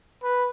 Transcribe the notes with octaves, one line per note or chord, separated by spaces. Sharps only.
B4